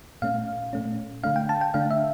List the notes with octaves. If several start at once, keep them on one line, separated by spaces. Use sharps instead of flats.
A#2 A3 C#4 F5
A#2 A3 C#4
D3 A3 D4 F5
G5
A5
G5
D3 A3 D4 F5
E5